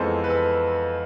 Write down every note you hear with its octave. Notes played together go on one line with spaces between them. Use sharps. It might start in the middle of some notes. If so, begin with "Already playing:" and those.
Already playing: F2 E3 G#3 B3 A4 C5
B4
A4